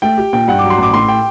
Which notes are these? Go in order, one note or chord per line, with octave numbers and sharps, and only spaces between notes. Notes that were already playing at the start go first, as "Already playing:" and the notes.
A3 G5
G4
A#2 G5
G2 F#5
D6
F#3
C6
A1 D6
A2 C6
G5